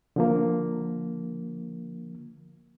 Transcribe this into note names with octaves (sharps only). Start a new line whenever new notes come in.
D3 F3 A#3